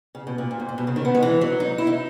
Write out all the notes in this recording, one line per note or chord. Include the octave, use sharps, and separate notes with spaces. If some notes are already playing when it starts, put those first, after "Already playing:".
C#3
B2
A#2
A#2
G#2
A#2
B2
C#3
D#3
B3
G#3
E3
F#3
D#4
E4
D#4